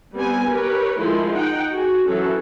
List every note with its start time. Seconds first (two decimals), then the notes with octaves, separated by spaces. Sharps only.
0.14 G3 B3 C4 G#5
0.49 G4 A#4 B4 C#5
0.98 D#3 F3 G#3 A3 E4 C6
1.33 D#4 F#5 G5
1.71 F#4 G#4
2.07 E3 F#3 C4 C#4 A4